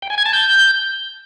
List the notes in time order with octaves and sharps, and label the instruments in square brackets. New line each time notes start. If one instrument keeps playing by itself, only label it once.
[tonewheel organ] G5
G#5
G#6
A5
G6